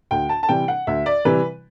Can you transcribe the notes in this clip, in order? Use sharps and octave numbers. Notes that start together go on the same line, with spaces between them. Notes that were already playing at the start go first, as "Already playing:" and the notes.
D2 G5
A5
A5
C3 E3 G3 G5
F#5
D2 E5
D5
C3 E3 G3 B4